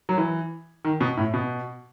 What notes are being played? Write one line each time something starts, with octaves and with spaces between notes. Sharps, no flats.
F#3
E3
D#3
B2
A2
B2